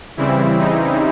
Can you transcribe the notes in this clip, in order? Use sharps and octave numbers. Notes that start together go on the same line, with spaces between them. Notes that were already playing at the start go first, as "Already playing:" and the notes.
C#3 E3 G3 C4 E4
D#4